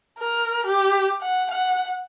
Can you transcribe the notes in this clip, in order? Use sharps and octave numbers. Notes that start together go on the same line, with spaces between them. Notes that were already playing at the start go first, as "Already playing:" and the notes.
A#4
G4
F#5
F#5